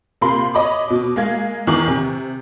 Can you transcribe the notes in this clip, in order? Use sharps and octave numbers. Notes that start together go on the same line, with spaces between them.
C3 A#3 F4 B5 C6
C#5 D#5 B5 D6
B2 D6
G#3 A#3 F5 G#6
E2 D#3 E3 C#6 D6
C3